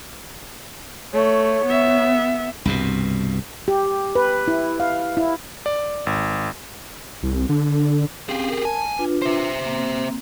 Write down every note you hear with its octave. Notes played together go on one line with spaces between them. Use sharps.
A3 C#5
B3 E5
C2 G2 B2
G4
B4
E4
F5
E4
D5
G#1
C2
D3
C4 C#4 G4 G#4 F5
A#4
G#5 A5
D4 F4 B4
C5 E5
A#3 C4